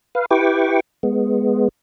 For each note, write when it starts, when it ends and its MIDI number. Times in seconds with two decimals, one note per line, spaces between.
0.15 0.26 71
0.15 0.26 77
0.31 0.80 64
0.31 0.80 67
0.31 0.80 71
0.31 0.80 79
0.31 0.80 85
0.31 0.80 86
1.03 1.68 56
1.03 1.68 59